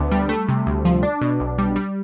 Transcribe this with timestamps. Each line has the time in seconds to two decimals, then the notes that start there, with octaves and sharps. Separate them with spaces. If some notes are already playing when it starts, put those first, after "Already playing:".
Already playing: D2 D3 B3 D4
0.11 G3
0.29 A3
0.49 C3
0.67 D2
0.85 F3
1.03 D4
1.21 B2
1.40 B1
1.58 G3
1.76 G3